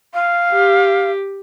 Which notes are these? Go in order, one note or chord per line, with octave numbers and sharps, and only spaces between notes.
F5
G4